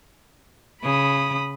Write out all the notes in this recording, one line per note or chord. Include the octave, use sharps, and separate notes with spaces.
C#3 B5 D#6